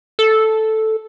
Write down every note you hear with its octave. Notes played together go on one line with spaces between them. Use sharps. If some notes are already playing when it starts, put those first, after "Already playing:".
A4